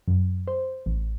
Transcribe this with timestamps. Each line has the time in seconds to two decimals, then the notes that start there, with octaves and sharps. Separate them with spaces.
0.08 F#2
0.48 C5
0.86 A1